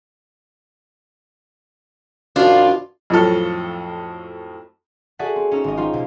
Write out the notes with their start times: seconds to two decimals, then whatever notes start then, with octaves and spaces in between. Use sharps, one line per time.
2.36 F#2 B2 D#3 F3 D4 F4 F5
3.10 F2 A2 F3 F#3 A4 F6
5.19 F#4 G#4 A4 D5 E5 F#5
5.36 C4
5.51 C#4 D#4 A#5 E6
5.64 G#1 D#5
5.77 G3 D#4 F4 C5
5.93 C2 B2